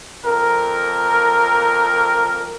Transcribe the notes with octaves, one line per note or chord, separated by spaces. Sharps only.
F2 A#4